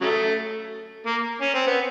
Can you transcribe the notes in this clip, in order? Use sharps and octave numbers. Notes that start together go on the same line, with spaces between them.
C#3 F#3 A3
A#3
C#4
C4
B3